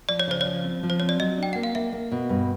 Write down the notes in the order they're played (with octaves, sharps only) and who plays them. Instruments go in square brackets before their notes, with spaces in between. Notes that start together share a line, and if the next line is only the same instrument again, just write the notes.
[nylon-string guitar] F3 [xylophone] D5
[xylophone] C#5
[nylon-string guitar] C#3 [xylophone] C5
[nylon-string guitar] F3 [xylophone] C#5
[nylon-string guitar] C4
F3
[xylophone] C5
[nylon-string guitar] C4 [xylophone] C#5
[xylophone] D5
[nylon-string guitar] F#3 [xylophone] D#5
[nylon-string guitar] D4 [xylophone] G5
[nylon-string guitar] A#3 [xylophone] F#5
[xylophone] F5
[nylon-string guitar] A#3 [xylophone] E5
[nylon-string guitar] A#3
B2
G2